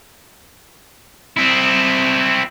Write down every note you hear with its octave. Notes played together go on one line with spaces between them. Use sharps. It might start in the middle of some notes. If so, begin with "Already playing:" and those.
C4 E4